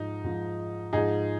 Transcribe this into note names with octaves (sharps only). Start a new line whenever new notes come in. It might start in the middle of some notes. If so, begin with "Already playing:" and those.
Already playing: G#2 F3 D#4
G#2 F3
G#2 F3 D#4 G#4